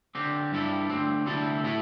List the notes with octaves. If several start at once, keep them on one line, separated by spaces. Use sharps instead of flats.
D3 C4 G4
G2 G3 E4 A4
D2 D3 C4
D2 C3 G3 E4 A4
A2 A3 E4 A4